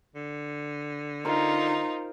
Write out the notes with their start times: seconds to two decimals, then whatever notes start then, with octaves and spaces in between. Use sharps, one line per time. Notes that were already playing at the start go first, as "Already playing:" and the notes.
0.15 D3
1.25 D#4 F4 A#4 C5